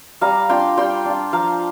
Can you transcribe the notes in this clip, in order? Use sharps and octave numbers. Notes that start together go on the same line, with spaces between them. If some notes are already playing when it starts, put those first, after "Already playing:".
G3 F5 A#5
D4 F4 G5 C6
G3 G5 C6
D4 F4
F3 F5 A#5